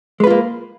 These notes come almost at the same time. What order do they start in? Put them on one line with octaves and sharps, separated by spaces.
G#3 B4 F4 A#3